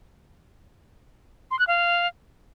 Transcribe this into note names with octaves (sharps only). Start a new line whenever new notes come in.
C6
F#6
F5